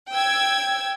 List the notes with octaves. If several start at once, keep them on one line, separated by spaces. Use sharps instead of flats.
G5 E6 G#6